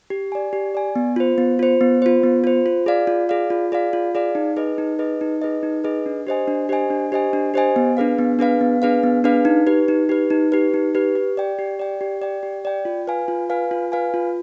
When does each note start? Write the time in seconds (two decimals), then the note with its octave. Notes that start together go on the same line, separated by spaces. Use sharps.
0.10 G4
0.32 D5 G#5
0.53 G4
0.75 D5 G#5
0.96 B3
1.16 F4 C5
1.38 B3
1.59 F4 C5
1.81 B3
2.02 F4 C5
2.23 B3
2.44 F4 C5
2.66 F4
2.86 G#4 D5 F5
3.07 F4
3.29 G#4 D5 F5
3.50 F4
3.72 G#4 D5 F5
3.93 F4
4.15 G#4 D5 F5
4.35 D#4
4.57 G#4 B4 D#5
4.78 D#4
4.99 G#4 B4 D#5
5.21 D#4
5.42 G#4 B4 D#5
5.63 D#4
5.84 G#4 B4 D#5
6.06 D4
6.27 G4 C5 D#5 G#5
6.48 D4
6.69 G4 C5 D#5 G#5
6.90 D4
7.12 G4 C5 D#5 G#5
7.33 D4
7.54 G4 C5 D#5 G#5
7.76 B3
7.97 D4 G#4 B4 F5
8.19 B3
8.39 D4 G#4 B4 F5
8.61 B3
8.82 D4 G#4 B4 F5
9.03 B3
9.24 D4 G#4 B4 F5
9.45 D#4
9.67 G4 B4
9.88 D#4
10.09 G4 B4
10.30 D#4
10.52 G4 B4
10.74 D#4
10.95 G4 B4
11.15 G4
11.37 D5 G5
11.59 G4
11.79 D5 G5
12.01 G4
12.22 D5 G5
12.43 G4
12.65 D5 G5
12.85 F4
13.08 B4 F5 G#5
13.28 F4
13.50 B4 F5 G#5
13.71 F4
13.92 B4 F5 G#5
14.14 F4